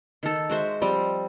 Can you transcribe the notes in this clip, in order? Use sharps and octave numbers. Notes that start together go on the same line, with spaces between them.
D#3 A4
G#3 F#4 C5 E5
F3 G3 C4